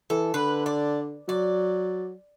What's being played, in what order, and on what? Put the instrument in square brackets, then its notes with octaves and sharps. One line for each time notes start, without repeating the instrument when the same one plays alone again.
[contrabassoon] E3 [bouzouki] A4
[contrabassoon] D3 [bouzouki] B4
[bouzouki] D5
[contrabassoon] F#3 [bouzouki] D5